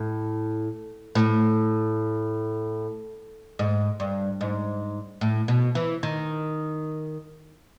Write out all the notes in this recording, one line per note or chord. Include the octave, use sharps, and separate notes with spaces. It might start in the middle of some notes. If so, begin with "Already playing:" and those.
Already playing: A2
A2
G#2
G2
G#2
A2
B2
E3
D#3